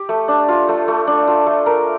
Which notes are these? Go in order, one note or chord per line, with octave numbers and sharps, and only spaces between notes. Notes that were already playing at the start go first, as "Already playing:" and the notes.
Already playing: G4
A3
D4
F4
A3
A3
D4
F4
A3
A#4